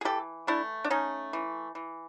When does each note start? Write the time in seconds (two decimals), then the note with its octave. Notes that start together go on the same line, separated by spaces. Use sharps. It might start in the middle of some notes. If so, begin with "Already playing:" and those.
0.01 G#4
0.05 E3 G4 A4
0.47 A3 D4 E4
0.84 D4
0.90 A3 C#4 D#4
1.33 E3
1.75 E3